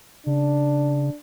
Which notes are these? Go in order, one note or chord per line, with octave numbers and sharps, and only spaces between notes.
C#3 D4